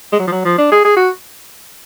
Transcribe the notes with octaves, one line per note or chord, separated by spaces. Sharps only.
G#3
F#3
F3
F#3
F3
D4
G#4
G#4
F#4